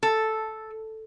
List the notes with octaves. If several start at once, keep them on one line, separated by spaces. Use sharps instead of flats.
A4